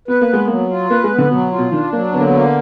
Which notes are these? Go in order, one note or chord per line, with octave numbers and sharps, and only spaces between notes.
B3 B4
A#3
G#3 B3
F#3 A#3
F4
A#3 B4
G#3
B3
D3
B2 F#3
F4
B2
D#3 D4
F#3 A#3
D3 B3
A#3
B3
A#3